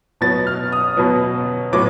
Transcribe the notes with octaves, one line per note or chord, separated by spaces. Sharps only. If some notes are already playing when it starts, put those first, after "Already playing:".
B2 F#3 B3 A6
F6
D#6
B2 F#3 B3
A2 F#3 B3 D6